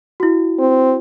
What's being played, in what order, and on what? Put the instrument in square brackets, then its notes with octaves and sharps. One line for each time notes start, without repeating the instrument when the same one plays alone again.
[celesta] E4 F#4
[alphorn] C4